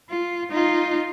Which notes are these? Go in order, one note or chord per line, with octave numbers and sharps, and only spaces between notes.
F4
D#4 F4